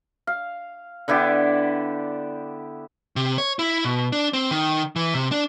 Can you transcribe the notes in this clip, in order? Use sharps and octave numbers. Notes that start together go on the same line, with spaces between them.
F5
D3 B3 E4 G4
C3
C#5
E4
B2
D4
C4
D#3
E3
C3
D4